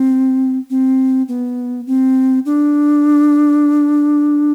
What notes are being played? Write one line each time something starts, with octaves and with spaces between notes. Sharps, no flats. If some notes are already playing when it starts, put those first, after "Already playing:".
Already playing: C4
C4
B3
C4
D4